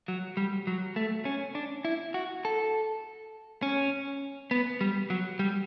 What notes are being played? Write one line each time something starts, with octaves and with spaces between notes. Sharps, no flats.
F#3
G3
F#3
A3
C#4
D4
E4
F#4
A4
C#4
B3
G3
F#3
G3